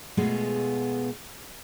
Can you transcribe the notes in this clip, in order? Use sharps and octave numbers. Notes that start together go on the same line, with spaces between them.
B2 G#3 A3 B3 F4 G#4